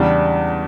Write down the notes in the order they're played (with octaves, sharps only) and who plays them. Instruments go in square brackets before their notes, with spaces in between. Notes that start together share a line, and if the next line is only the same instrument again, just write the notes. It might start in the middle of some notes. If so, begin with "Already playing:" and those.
Already playing: [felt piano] E2 C#3 G3 D4